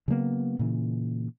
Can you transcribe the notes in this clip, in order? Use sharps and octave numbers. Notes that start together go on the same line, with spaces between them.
C#3 F#3 A#3 B3
A#2 C#3 E3